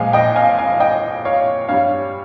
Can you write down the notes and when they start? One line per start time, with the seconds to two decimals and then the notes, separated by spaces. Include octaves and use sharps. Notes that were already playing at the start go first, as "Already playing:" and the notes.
Already playing: A#2 F3 G#3 F5 G#5
0.13 D#5 G5
0.36 F5 G#5
0.59 F5 G#5
0.80 D#5 G5
1.25 C#5 F5
1.68 G2 G3 C#5 F5